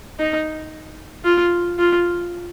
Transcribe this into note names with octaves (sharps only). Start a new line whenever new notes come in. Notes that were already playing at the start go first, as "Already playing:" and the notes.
D#4
F4
F4